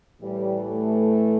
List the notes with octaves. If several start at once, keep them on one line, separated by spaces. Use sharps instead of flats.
A2 E3 G3
A3